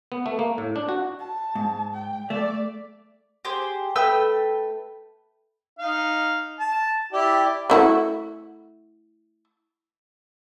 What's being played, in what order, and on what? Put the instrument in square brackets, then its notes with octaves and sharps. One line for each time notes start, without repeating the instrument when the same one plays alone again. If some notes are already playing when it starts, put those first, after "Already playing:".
[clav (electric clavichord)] B3
A3
A#3
A2
D4
F#4
[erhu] A5
[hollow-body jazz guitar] G#2
[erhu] G5
[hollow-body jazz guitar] A3 [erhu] D5
[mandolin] G4 G#4 C5
A3 B4 G5 E6
[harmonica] D#4 F5
A5
E4 G4 D5
[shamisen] A3 E4 F#4